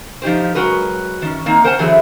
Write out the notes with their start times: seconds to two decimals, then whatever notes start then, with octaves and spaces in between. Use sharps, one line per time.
0.22 F3 D#4 G4 C5
0.55 F#3 G#3 F#4 A#4 B4
1.22 D#3 C#4
1.46 D#3 A#3 C4 D#4
1.64 A#4 C5 F#5 G#5 A5
1.79 D3 E3 F#3 A3 G#4 C5